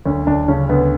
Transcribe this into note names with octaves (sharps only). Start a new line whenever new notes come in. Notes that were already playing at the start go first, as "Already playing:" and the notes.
D2 C#4
D2 D4
C#3 C#4
D2 B3